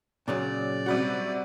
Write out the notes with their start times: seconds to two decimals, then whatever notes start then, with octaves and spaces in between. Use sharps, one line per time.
0.28 A#2 C#3 F#3 D5
0.86 C3 G3 F#4